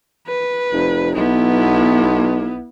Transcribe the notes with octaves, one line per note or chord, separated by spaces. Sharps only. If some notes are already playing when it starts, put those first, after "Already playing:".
B4
F1
B1 B3 E4